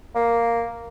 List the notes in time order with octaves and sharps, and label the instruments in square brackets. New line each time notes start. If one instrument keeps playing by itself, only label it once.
[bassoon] A#3